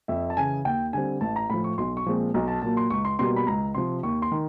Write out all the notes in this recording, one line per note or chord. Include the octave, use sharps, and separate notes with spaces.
F2 E5
A5
C#3 E3 G#5
D#2 G5
D3 G3 C4 G#5
A1 A5
A#5
A2 F3 B5
C#6
B1 C6
C#6
A#2 F3 G#3 C4
B1 A#5
A5
A#2 F#3 A#3 A5
C6
C#2 C#6
C6
B2 G3 A#3 C6
B5
C#2 A#5
C3 F3 C6
D#2 C#6
C6
D#3